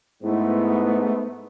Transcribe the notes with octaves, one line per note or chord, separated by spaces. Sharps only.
G#2 A3 B3 E4